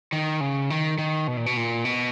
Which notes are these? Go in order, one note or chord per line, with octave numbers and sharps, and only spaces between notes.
D#3
C#3
D#3
D#3
B2
A#2
B2
A#2
B2